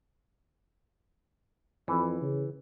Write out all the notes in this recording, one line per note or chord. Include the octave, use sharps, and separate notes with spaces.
F2 E3
C#3